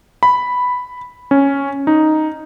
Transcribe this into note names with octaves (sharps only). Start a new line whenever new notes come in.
B5
C#4
D#4